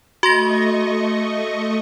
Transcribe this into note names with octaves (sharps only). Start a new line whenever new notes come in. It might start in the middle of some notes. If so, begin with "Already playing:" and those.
A3 F#4 D#5 C6 C#6 A#6